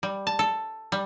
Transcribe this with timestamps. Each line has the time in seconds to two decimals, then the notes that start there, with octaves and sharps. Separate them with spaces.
0.03 G3
0.27 A5
0.39 A4
0.92 G3